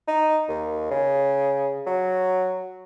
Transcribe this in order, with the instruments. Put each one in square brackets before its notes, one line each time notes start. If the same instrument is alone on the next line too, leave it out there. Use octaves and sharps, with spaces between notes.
[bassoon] D#4
D#2
C#3
F#3